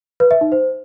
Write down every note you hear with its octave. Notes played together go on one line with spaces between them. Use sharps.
B4
E5
D#4
C5